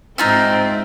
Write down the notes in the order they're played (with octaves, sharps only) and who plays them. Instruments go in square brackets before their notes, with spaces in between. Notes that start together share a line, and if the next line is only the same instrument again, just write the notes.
[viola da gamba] G#2 C4 [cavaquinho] D#4 F4 E5